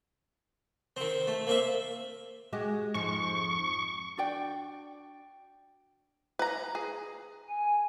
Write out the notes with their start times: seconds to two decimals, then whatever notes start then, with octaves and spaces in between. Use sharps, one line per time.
0.97 D#3 C4
1.27 A3
1.47 A#3 C4 E5
2.53 G#3 F#4 G4
2.94 F2 G#2 F3 C#6
4.17 D4 F#4 D5 G5
6.39 B4 A#5
6.75 G#4
7.49 G#5